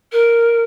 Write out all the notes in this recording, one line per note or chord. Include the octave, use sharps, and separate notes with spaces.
A#4